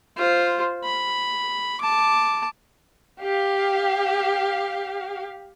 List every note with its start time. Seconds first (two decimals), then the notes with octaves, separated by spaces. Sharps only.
0.17 F4 C5
0.85 B5
1.81 A5 D6
3.22 G4 F5